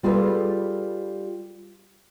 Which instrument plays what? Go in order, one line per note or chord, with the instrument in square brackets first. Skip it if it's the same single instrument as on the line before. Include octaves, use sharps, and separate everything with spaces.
[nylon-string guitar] G3 F4 G#4 A4 B4